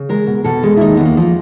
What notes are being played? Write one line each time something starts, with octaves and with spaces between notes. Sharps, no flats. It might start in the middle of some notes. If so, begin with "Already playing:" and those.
Already playing: C#3
G#3 A#4
B2
B2 A4
G#3
E4
D#2 D#4
D#2 B3
A#3
F3